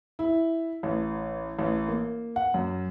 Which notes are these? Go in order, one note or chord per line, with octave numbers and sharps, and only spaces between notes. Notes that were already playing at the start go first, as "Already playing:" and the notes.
E4
A1
A1
A#3
F#5
F#2